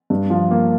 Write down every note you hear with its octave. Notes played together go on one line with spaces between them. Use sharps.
G2
F3
A#3